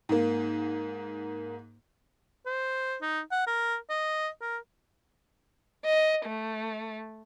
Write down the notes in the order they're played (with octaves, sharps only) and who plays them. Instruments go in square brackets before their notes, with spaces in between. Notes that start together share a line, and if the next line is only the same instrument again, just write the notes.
[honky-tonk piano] G#2 A#3
[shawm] C5
D#4
F#5
A#4
D#5
A#4
[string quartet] D#5
A3